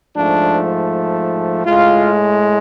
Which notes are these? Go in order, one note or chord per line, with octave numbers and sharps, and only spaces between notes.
G#2 F3 A3 D4
A2 G#3 F4